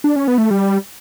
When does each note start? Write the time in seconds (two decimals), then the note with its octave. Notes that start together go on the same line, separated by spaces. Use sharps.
0.04 D4
0.16 C#4
0.28 B3
0.38 A3
0.51 G3